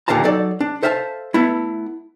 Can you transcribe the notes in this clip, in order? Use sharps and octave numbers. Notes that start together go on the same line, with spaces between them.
D#2 A#2 D3 F5 A5 A#5
F#3 D#4 A4 D5
D4
A4 C5 E5 F5 G5 A5
A3 B3 E4